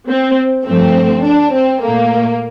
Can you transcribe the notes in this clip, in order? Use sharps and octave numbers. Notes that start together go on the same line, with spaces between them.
C4
G2 F3 A3 C4
D4
C4
A#2 A3 A#3